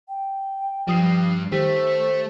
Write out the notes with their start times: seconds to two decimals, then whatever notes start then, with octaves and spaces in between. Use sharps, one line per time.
0.09 G5
0.88 G2 F3 G3 D#6 C7
1.52 D#3 A3 G4 C5 B6